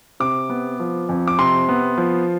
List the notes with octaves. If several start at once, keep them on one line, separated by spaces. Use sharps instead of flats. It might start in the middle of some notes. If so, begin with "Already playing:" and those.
C3 D6
B3
F3
F2
D6
C3 C6
B3
F3